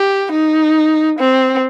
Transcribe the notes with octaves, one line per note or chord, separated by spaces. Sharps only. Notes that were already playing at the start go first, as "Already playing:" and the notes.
Already playing: G4
D#4
C4